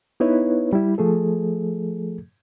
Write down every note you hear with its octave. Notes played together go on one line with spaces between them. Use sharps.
B3 D#4 E4 B4 C#5
G3 E4
F3 A3 G#4 A4